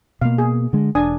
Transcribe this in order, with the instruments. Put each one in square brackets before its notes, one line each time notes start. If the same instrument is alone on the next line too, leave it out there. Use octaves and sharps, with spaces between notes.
[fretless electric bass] B2 A#3 [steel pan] F5
[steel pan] G#4
[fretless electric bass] D3 G#3
[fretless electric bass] E1 [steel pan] D4 G#5 D#6